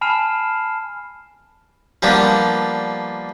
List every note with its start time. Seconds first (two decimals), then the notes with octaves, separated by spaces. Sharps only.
0.01 G#5 A5 B5 F6 C7 E7
2.02 F3 G3 A#3 B3 D4